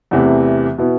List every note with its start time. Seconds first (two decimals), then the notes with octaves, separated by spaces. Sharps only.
0.11 E2 C3 E3 A3
0.78 B2 B3 E4